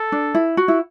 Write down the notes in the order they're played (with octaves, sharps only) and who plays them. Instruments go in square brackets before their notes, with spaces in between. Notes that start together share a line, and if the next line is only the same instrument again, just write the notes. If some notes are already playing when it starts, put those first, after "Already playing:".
Already playing: [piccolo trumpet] A4
[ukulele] D4
E4
F#4
E4